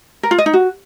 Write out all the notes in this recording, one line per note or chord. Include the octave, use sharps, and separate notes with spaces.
A#4
F4
D#5
D#4
F#4